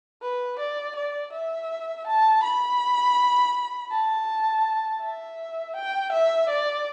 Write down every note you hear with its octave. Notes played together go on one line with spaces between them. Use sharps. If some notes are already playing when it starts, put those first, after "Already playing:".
B4
D5
D5
E5
A5
B5
A5
E5
G5
E5
D5